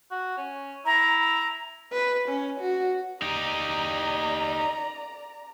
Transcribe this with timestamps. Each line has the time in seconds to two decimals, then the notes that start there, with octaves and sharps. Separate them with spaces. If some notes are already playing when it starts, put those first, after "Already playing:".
0.11 F#4
0.37 C#4
0.86 E4 A#5
1.92 B4
2.28 C#4
2.60 F#4
3.22 D#4 G4 D5 A#5